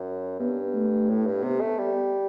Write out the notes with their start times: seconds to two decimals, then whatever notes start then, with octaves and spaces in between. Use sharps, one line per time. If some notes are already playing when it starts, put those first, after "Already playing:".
Already playing: F#2
0.40 G2 B3
0.74 A3
1.09 A2
1.27 G2
1.43 C3 B3
1.61 A3
1.78 G3